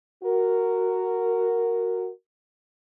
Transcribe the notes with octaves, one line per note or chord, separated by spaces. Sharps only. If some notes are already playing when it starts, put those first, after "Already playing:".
F#4 A#4